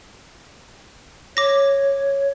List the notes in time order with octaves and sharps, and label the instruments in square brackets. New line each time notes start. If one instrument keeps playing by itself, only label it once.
[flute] C#5 [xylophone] D6 A#6